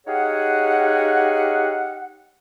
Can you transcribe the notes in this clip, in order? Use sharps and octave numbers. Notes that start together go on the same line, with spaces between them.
D#4 G4 G#4 C#5 F5 F#5